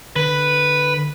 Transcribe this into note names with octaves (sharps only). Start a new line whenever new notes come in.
D3 B4